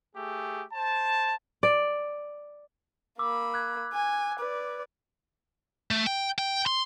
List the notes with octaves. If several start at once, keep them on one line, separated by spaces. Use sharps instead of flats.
A3 G4 G#4
C5 A5
D5
A#3 B5 D6 E6
F#6 G#6
G#5
B4 D5 D6
A3
G5
G5
C6